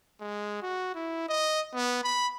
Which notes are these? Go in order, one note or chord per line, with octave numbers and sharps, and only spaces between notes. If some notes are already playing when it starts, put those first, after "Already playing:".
G#3
F#4
E4
D#5
B3
B5